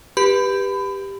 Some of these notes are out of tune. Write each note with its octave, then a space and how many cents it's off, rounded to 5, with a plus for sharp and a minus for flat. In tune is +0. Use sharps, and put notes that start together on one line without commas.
G4 +10 B4 -15 B5 +30